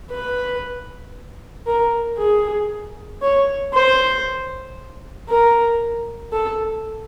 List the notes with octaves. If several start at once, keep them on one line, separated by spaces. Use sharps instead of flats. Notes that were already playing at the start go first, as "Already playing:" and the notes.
B4
A#4
G#4
C#5
C5
A#4
A4